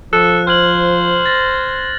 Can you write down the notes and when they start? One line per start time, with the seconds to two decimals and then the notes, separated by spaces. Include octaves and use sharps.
0.13 F3 A4 F#6
0.47 C5 F6 G#6 F#7
1.26 A6 A#6